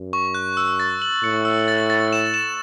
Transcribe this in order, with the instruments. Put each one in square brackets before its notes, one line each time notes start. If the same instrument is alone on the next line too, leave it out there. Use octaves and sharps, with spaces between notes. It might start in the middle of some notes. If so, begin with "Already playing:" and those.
Already playing: [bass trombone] F#2
[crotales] C#6
F#6
E6
A6
F#7
[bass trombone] A2 [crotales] C#7
[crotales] E6
A6
A6
E7
E7